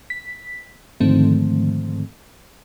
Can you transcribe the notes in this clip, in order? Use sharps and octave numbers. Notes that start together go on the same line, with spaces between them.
B6
G#2 D3 D#3 F3 A3 C4